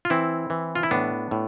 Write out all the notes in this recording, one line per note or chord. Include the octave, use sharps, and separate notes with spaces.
F4
E3 C4 E4
E3
F4
E4
A2 B3 D4
A2